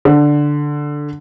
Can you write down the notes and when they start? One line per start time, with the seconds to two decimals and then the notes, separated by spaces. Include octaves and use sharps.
0.05 D3